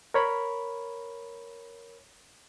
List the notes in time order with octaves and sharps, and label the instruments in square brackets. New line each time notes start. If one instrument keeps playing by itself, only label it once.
[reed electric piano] A#4 C#5 B5